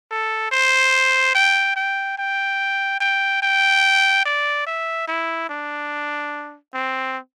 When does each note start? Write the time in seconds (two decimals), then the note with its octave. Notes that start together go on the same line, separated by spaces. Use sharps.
0.11 A4
0.52 C5
1.35 G5
1.76 G5
2.18 G5
3.01 G5
3.43 G5
4.26 D5
4.67 E5
5.08 E4
5.49 D4
6.74 C4